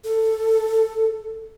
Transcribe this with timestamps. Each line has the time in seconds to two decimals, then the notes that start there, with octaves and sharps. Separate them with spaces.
0.04 A4